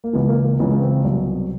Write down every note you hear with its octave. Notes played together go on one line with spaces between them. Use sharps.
A#3
C#2 C#3 E3 B3
A#3
A#3
C#2 C#3 E3 B3
C4
C2 B2 F#3